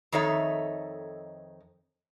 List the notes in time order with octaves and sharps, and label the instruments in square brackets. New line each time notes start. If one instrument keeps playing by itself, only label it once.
[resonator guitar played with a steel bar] F2 D#3 D#4 A4 C#5 E5